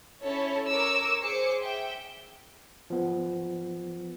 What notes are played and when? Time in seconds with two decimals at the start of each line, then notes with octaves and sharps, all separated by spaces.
0.22 C#4 E4 A4 C#5
0.69 A#4 C#5 D6 E6
1.21 G#4 C5 D6 C#7
1.61 E5 G5
2.90 F3 B3